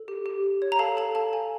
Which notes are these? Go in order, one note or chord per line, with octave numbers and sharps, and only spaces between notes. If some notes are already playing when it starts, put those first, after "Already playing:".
Already playing: A4
G4
G4
G4
C#5
A#5
A4 F5 A5
A4 A5
A4 F5 A5
F5 G#5